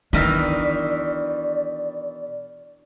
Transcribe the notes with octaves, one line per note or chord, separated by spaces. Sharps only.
B2 D#3 E3 D4 D5